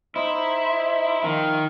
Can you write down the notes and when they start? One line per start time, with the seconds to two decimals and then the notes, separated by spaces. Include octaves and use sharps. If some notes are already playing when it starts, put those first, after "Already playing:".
0.16 D#4 E4 C5 D#5
1.24 D#3 F3